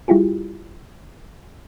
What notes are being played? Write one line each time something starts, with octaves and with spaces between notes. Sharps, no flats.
G3 E4 F4 G4 G#4